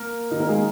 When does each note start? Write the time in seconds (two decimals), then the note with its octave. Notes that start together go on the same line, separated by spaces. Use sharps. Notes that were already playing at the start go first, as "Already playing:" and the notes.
Already playing: A#3 A#4
0.31 D#3 D#4
0.40 A#3 A#4
0.49 G#3 G#4